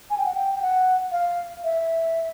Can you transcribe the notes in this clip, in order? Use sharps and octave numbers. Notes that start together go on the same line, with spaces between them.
G#5
G5
F#5
G5
G5
F#5
F5
E5